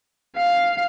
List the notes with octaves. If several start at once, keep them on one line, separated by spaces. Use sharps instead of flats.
F5